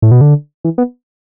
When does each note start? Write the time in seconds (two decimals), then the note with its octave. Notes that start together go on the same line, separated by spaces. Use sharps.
0.02 A2
0.11 B2
0.21 D3
0.64 E3
0.78 B3